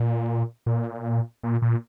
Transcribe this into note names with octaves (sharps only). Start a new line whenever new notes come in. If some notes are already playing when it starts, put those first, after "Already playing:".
Already playing: A#2
A#2
A#2
A#2